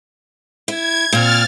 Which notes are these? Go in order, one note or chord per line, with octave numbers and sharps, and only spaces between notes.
E4 G#6
A#2 C4 F6 A6